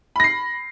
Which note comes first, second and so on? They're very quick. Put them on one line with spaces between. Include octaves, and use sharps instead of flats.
B5 A#6 C7